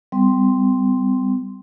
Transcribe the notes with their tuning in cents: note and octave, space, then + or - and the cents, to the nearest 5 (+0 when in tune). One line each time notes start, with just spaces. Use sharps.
G3 +0 C4 -45 C6 +0